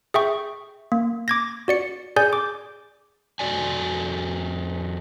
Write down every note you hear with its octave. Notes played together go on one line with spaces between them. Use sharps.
G#4 E5 G5 C#6
A#3
D6 G#6 A#6
F#4 D5 C#7
G#4 D5 G#5 G6
D6
F2 F#4 D5 G#5